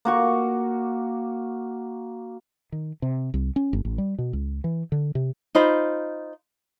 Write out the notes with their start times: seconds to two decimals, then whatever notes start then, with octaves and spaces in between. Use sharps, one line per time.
0.05 A#3 F#4 C#6
2.72 D#3
3.02 C3
3.34 C2
3.56 C#4
3.73 G1
3.85 A1
3.98 G3
4.18 B2
4.33 C#2
4.64 E3
4.92 D3
5.15 C3
5.55 D#4 F4 C5 B5